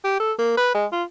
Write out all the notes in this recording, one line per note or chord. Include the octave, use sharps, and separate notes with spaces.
G4
A4
A#3
B4
G#3
F4